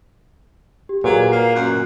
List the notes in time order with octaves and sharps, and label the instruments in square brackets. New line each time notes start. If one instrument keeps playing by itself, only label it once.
[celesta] G4
[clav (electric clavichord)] A#2 [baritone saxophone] F#3 [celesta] G#4 B4
[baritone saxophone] A#3 [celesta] C7
[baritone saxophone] F#2 [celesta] F#6